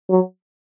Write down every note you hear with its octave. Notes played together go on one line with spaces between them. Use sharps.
F#3